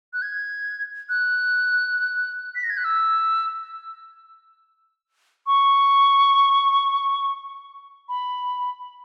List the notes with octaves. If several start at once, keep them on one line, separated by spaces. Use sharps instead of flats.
F#6
G#6
F#6
B6
A#6
G#6
F#6
E6
C#6
B5